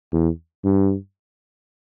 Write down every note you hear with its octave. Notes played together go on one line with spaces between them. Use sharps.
E2
G2